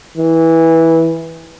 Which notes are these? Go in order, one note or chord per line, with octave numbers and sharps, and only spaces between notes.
E3